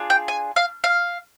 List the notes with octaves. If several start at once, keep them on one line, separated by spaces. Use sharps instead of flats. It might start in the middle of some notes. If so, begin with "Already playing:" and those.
Already playing: D4 F4 G#4
G5
G#5
F5
F5